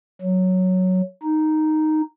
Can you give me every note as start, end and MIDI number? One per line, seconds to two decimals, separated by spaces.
0.22 1.02 54
1.23 2.01 63